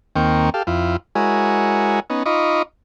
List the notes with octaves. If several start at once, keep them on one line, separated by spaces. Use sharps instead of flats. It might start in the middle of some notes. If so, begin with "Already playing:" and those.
D#2 D#3 A#3 C4 G5 C#6
G4 A4 F5
F2 E4 F4
G#3 E4 F#4 A#4 C#5 G#5
B3 C#4 D#4
D#4 F4 D#5 B5 C#6 D6